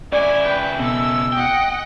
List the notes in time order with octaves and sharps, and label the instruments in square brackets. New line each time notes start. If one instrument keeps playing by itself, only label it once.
[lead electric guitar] C#3 E4 [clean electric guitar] D5 [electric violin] G#5
[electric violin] B4 G5
[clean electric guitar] B2 [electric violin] A4 E6
[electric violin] D#5 F#5 [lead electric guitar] G5